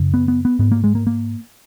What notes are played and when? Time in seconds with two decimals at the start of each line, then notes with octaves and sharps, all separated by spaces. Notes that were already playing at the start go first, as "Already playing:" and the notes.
Already playing: F#2 C#3
0.14 B3
0.28 B3
0.45 B3
0.59 G#2 B3
0.72 A#3
0.84 G#3
0.95 A#3
1.07 A#3